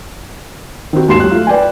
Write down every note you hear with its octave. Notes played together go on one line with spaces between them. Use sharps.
D#3 C4 F#4
D#2 G#2 F#4 C6 C7 E7
F#3 F#6
A3 F4
B4 D5 G5 G#5